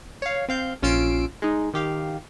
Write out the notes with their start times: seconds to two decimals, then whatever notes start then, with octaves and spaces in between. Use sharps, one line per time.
0.22 C#5 F5
0.49 C4 F5 G6
0.82 A#1 C#4 F4 E6 C7 D7
1.42 G#3 D#4
1.74 D#3 G4 F5